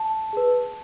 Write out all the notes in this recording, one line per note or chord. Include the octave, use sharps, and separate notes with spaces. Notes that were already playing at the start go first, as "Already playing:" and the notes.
Already playing: A5
G#4 B4